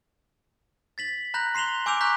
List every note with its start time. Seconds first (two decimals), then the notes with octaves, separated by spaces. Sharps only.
0.98 A6 B6 F#7
1.34 A#5 B5 F#6 G6 A#6 F#7
1.55 C6 C7 E7 F7 G7
1.86 G#5 D6 E6 G6 D7 F7
2.01 A#5 C#6 F#6 G6 B6